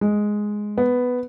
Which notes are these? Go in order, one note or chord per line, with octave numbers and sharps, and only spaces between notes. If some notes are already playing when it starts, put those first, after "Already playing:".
G#3
B3